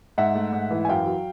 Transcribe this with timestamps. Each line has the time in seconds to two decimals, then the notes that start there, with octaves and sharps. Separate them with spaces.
0.18 G#2 E5 F#5
0.35 A3
0.53 G#2
0.71 E3
0.85 G#5
0.88 F#2 F5 G5
1.06 F#3